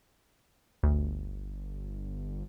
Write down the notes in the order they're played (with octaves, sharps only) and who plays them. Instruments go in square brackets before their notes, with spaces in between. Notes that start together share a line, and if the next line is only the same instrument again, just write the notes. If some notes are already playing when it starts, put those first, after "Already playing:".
[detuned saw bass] G1 [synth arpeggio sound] D2